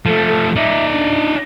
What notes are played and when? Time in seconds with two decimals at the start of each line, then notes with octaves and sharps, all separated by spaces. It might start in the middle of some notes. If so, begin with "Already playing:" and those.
0.06 F3 A3 A4
0.26 A4
0.56 D#4 D5 E5
0.92 D4